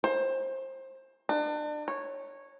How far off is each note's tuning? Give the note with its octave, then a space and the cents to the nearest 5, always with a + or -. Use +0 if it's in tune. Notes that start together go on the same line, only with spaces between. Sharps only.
C5 +25
D4 +35
C#5 -10